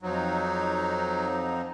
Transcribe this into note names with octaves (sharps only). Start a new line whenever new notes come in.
F2 F3 F#3 D#4